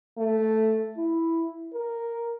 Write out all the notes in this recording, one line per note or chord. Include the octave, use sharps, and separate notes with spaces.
A3
E4
A#4